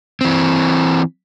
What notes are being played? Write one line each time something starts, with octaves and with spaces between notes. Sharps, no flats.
E3 C4